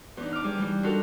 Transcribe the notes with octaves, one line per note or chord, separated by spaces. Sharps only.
E2 D4 D#4
D6 F6
G3 G#4
E3 G3
D4 D#4 F4 F#4 A4 A#4